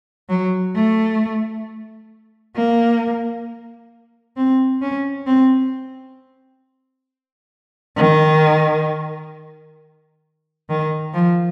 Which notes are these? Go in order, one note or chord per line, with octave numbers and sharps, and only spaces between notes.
F#3
A3
A#3
C4
C#4
C4
D#3
D#3
F3